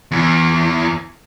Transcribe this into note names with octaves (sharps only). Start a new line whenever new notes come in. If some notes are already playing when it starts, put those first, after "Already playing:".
E2 E3